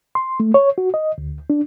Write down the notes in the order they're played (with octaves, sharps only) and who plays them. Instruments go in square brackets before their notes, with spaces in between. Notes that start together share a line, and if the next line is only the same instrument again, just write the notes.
[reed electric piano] C6
A3
C#5
F#4
D#5
D2
D4